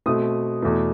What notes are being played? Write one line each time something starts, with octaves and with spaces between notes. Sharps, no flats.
B2 A3 C4 D#6
E2 B2 A3